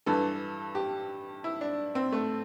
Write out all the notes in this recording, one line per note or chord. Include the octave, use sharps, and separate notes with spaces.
G2 E3 A4
G4
E4
D4
C4
A3